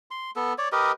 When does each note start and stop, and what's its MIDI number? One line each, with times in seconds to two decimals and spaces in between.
0.11 0.31 84
0.36 0.53 59
0.36 0.53 69
0.58 0.69 73
0.58 0.69 74
0.72 0.92 67
0.72 0.92 70
0.72 0.92 71
0.72 0.92 75